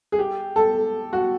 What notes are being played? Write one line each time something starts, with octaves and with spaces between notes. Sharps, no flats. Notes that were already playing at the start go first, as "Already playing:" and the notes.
G#4
G4
A4
F#4